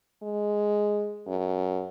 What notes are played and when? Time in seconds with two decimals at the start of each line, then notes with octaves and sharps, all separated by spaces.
0.23 G#3
1.27 F#2